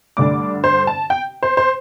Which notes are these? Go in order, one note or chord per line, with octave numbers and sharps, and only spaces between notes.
G2 D3 A3 D4 D6
C5
A5
G5
C5
C5